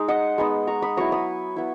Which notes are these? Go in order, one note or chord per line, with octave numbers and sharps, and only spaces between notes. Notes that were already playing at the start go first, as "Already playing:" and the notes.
Already playing: G#3 D#4 A#5
D#5 F#5
G#3 B3 D#4
A#5 C#6
B5 D#6
F#3 B3 E4 A#5 C#6
B5 D#6
B3 E4